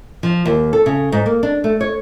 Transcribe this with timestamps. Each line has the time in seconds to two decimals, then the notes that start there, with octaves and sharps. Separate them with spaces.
0.23 F3
0.46 D#2
0.73 A4
0.86 C#3
1.12 G#2
1.26 A#3
1.43 D4
1.64 A3
1.81 C#5